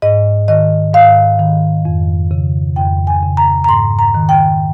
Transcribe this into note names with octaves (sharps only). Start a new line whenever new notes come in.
G#2 D#5
D#3 D#5
G#2 F5
D#3
F2
C#3
F2 G5
G#5
C#3
A#5
A#5
G#2 C6
A#5
D#3
G5